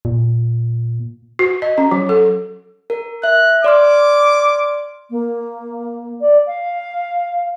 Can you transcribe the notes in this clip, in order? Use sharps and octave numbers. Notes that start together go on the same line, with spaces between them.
A#2
F#4
D#5
C#4
F#3
A4
A#4
E5 F#6
D5 C6 D6 F6
A#3
D5
F5